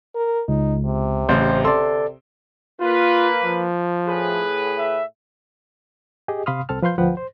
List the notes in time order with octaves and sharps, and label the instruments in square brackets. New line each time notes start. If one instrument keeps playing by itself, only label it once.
[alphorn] A#4
[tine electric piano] C#2 [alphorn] D#4
[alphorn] C3
[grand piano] A1 C#3 C6 [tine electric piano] C5
[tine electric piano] A4 D5 [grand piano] C6
[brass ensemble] A#3 B4 [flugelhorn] F4
[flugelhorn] F3
[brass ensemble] A2 G#4 B4
[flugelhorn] E5
[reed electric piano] G4 G#4 D#5
C3 F5 B5 C6 D#6 F6
C2 C4 A4 A5 F6
F3 B4 F5 C6 G6
D2 F3 B4 F#5 G5
C5